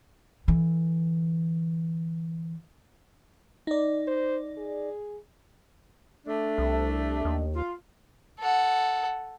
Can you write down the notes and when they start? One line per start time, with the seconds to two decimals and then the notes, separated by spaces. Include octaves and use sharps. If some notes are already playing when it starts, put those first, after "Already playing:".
0.48 D3 E3
3.67 D#4 D5
4.08 C5
4.57 G#4
6.26 A3 D4
6.58 C2
7.25 D#2
7.55 F4
8.39 A4 F#5